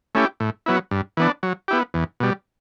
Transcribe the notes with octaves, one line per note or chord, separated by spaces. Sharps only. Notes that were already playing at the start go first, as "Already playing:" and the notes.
A3 C#4 E4 G4
A2
F#3 B3 E4
G2
E3 B3 D4
F#3
B3 E4 G4
E2
B2 G3